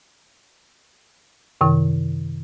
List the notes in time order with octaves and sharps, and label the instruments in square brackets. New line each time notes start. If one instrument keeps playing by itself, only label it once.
[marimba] F#2 C3 D#3